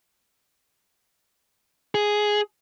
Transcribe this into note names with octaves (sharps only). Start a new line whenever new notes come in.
G#4